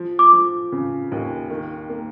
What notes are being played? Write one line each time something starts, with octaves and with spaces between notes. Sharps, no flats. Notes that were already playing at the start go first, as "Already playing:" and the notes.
Already playing: F3
D6
F3
C#3
D#2
D#3
A#3